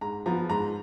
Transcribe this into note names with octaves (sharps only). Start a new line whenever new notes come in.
G#2 A#5
F3 B3 A#5
G#2 A#5